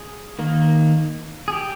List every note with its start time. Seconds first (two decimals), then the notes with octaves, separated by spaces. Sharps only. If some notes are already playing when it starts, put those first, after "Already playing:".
Already playing: G#4
0.39 D#3 A#3
1.48 G#4
1.53 G4